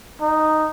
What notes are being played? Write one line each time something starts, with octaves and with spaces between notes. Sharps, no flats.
D#4